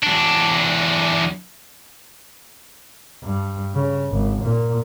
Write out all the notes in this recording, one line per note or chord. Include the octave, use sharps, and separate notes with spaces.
E2 D4
G2
C#3
G#1
A#2